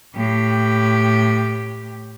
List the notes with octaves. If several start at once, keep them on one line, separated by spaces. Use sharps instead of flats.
A2 G4